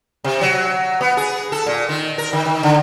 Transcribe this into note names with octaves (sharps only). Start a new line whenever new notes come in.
C3
F#3
B3
G#4
A4
A#2
D#3
A#4
D#3
D#3
D3